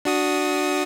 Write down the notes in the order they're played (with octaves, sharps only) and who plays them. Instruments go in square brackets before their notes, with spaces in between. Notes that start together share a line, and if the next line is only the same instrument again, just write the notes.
[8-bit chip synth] D4 F#4 D#6